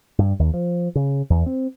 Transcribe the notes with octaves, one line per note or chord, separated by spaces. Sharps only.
G2
D#2
F3
C#3
E2
C4